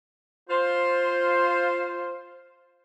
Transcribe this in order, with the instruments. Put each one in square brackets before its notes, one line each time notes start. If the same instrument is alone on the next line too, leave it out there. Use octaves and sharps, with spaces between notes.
[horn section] F4 C5